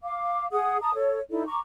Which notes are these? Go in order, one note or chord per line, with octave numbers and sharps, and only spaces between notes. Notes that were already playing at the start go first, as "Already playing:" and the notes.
F5 D6
G#4 F#5 D#6
A5 A#5 D#6
A4 C#5
D#4 E4 A4 D5
A#5 C#6 D6